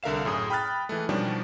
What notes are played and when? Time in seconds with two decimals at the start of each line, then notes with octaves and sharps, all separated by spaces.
0.03 C2 D3 A#4 E5 F5 E7
0.25 F#2 A2 G#4 D#6
0.50 G5 B5 D#6 F6 F#6 A6
0.89 E3 G#3 A3
1.09 B2 D#3 F3 G3 C#4 D4